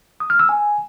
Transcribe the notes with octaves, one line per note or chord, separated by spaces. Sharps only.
D#6
F6
E6
G#5